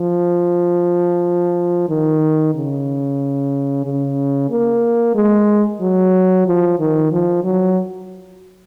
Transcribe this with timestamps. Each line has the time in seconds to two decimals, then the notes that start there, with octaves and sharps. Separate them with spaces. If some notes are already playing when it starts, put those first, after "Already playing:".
Already playing: F3
1.89 D#3
2.54 C#3
3.85 C#3
4.50 A#3
5.15 G#3
5.81 F#3
6.46 F3
6.80 D#3
7.12 F3
7.44 F#3